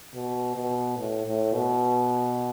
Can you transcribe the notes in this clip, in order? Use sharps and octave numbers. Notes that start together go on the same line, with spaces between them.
B2
B2
A2
A2
B2